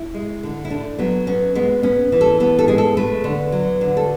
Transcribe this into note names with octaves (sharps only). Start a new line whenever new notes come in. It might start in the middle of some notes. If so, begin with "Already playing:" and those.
Already playing: E4
G#3
D3
E4
A3 D4
F#3 B3
B3 C#4
G#3 B3
B3 C#4
E3
A4
B3 A4
A4
G#3 G#4
A4
A3 B4
D3
F#3
D3
A4